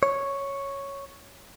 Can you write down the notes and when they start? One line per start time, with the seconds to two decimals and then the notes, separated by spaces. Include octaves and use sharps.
0.03 C#5